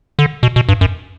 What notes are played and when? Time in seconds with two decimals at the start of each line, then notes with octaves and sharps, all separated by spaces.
0.19 D3
0.43 B2
0.56 B2
0.69 G2
0.81 F#2